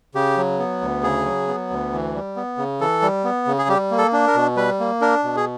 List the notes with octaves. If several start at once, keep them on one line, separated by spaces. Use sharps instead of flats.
C#3 G4
F#3
B3
D2
C#3 G#4
F#3
B3
D2
E3
G3
B3
C#3
E3 A4
G3
B3
C#3
G#4
G3 G4
A#3
A4
D4
A#4
B2
G3 B4
A#3
D4 A#4
B2
G#4